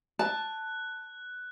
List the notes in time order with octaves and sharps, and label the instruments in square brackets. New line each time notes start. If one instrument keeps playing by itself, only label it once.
[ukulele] A5 [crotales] F#6